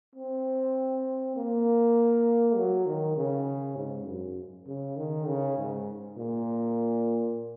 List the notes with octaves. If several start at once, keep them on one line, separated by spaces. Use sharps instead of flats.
C4
A#3
F#3
D#3
C#3
G#2
F#2
C#3
D#3
C#3
G#2
A#2